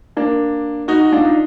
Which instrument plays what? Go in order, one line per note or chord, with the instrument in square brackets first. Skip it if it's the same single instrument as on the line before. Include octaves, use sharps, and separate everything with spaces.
[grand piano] A#3 D4
D#4 F#4
F#4
D4 F4
D#4